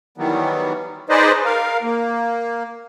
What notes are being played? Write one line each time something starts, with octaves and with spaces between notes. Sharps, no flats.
D#3 E3 F#3 G3 B3
D#4 G#4 B4 C5 D5 D#5
A#4 F5
A#3